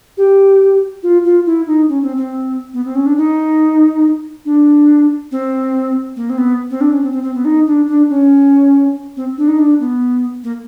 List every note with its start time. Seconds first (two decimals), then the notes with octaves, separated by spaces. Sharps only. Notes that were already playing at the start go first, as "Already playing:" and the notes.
0.17 G4
1.03 F4
1.25 F4
1.46 E4
1.67 D#4
1.89 C#4
2.03 C4
2.17 C4
2.74 B3
2.85 C4
2.95 C#4
3.06 D4
3.17 D#4
4.45 D4
5.32 C4
6.16 A#3
6.30 C4
6.38 B3
6.70 C4
6.81 D4
6.91 C#4
7.03 C4
7.13 C4
7.23 C4
7.34 B3
7.45 D#4
7.66 D4
7.88 D4
8.10 C#4
9.17 C4
9.38 D4
9.48 D#4
9.59 D4
9.80 B3
10.44 A#3